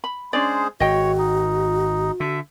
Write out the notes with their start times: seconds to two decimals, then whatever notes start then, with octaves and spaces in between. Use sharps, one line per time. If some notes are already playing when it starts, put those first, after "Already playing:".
0.04 B5
0.33 G#3 C#4 D4 G#4 C5 D5
0.80 G#1 F#4 C#5 D#5 G5
1.18 D#4
2.20 D3 E5